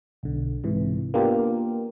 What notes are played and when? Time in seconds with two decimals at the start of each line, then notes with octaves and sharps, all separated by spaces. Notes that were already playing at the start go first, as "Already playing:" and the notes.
0.23 B1 D3
0.64 G#2 C3 E3
1.14 A#3 B3 D4 F4 G4 A#4